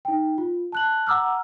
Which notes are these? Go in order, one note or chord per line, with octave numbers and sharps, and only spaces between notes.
D#4 G5
F4
A5 F#6 F#7
F#5 A#5 D6 E6 F6